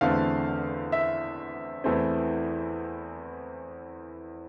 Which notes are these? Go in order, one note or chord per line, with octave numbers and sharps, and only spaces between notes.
E2 D3 A3 C4 F5
E5
E2 E3 A3 C4